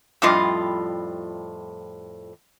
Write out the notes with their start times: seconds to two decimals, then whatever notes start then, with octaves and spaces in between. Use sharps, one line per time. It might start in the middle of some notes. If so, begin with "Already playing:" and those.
0.22 F2 A2 G3 F4 D#5